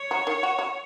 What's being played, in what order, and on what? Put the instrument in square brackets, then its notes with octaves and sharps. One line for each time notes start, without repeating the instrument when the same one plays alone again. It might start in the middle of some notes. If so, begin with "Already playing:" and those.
Already playing: [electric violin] C#5
[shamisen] F#3
D#3
F#4
F#4